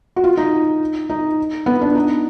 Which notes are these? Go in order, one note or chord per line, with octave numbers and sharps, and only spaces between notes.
F#4
F4
D#4
D#4
B3
D4
D#4